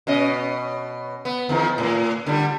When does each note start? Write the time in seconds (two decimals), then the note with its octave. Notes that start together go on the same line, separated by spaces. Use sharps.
0.07 B2 C#4 D#5
1.25 B3
1.49 E2 D#3 F3
1.78 A2
2.26 D3 G3